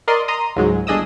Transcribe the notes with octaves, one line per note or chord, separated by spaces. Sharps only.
A#4 D5 D#5 C6
A#5 C6 D#6
C#2 G#2 F#3 G#3
G1 D4 G#4 D#5 D#6 E6